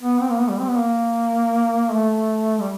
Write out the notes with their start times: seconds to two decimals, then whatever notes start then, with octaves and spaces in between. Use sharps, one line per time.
0.02 B3
0.21 C4
0.31 A#3
0.40 B3
0.50 G3
0.59 C4
0.68 B3
0.78 A#3
1.92 A3
2.61 G3